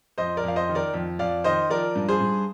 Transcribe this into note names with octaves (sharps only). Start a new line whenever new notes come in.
F2 C5 D#5
A#4 D5
F2 F5
C5 D#5
D#3
A#4 D5
F2
F2 D5 F5
D#3 C5 D#5
F3 A#4 D5
G2
G#4 C5
G2